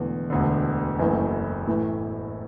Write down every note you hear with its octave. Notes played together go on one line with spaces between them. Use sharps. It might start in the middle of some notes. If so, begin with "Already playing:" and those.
Already playing: E1 E2 D3 A3
E1 D2 D3
F#1 F#2 E3 A3
A2 E3 A3